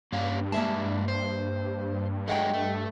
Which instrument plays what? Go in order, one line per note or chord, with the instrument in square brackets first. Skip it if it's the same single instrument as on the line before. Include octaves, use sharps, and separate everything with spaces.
[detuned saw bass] G2 [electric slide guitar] A#3 C#4 F5
[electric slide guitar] G#3 D4 [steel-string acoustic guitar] A#3 E5 A5
[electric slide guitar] C5
[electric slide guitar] F#3 G#3 A3 [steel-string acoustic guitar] D#5 F#5 G5
[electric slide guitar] A3